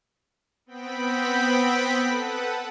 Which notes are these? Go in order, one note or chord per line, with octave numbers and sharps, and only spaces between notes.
B3 C4 G5 B5 B6
A4 B4 F#5